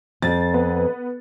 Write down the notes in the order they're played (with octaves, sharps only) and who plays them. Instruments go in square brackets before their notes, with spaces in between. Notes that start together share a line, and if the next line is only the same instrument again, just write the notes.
[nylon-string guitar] F2 [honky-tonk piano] A6
[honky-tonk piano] B3